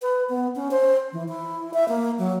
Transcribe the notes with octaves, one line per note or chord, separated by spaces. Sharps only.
B4
B3
C#4
C5
E3
E4
E5
A#3
F#3